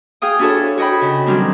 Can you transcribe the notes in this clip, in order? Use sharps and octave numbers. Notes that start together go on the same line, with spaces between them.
G#4 F5 G5 D#6
D4 E4 F#4 G#4 A4 C#5
F#4 C#5 D#5 G5 B5
C#3
D#3 F#3 G3 C4 D4